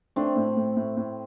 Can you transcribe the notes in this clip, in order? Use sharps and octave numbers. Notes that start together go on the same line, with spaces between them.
A3 C4 D4
A2
A2
A2
A2